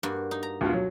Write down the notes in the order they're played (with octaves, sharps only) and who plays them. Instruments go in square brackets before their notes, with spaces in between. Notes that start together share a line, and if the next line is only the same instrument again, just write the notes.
[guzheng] G2 A#3 F#4
D#4
A#5
[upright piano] D2 B2 F4
F#3